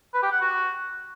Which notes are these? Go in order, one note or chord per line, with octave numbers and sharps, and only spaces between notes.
B4
G4
F#5
F#4